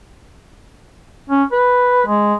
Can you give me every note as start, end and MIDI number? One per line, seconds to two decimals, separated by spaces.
1.30 1.44 61
1.52 2.04 71
2.06 2.35 56